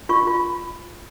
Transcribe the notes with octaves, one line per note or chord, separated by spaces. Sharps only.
F4 C#6
F4